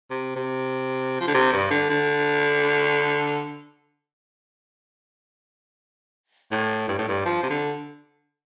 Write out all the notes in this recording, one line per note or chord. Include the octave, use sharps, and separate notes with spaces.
C3
C3
F3
D3
C3
G2
D3
D3
A2
G2
A2
G2
F3
C3
D3